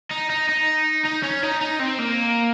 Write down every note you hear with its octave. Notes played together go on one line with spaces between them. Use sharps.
D#4
D#4
D#4
D#4
C#4
D#4
D#4
C4
A#3